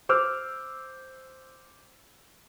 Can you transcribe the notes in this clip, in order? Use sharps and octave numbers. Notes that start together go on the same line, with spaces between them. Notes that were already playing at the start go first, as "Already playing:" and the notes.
C5 D6 E6 F6